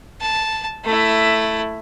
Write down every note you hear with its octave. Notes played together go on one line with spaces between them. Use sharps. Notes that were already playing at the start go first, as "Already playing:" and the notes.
A5
A3 E4